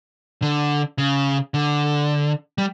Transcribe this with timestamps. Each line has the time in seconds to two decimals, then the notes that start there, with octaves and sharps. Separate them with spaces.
0.42 D3
0.98 C#3
1.54 D3
2.58 G3